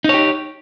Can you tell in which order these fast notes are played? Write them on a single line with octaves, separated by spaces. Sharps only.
D#4 C#5 G4